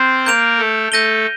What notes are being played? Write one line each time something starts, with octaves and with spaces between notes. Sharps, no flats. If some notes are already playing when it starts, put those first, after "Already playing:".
Already playing: C4 C5 F6 A6 C7
A#3 A#4 G6 D7 F7
A3 A4
A3 A4 G6 A#6 D#7 G7